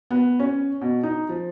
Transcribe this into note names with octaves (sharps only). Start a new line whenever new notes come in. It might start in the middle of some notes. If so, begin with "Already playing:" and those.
B3
C#4
B2
D#4
F3